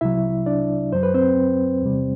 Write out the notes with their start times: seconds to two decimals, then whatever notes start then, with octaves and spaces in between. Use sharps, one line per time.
0.01 C2 C3 F#3 E4 E5
0.46 D4 D5
0.92 F#2 F#3 C5
1.03 B4
1.14 C4 C5
1.82 E2 C3 G3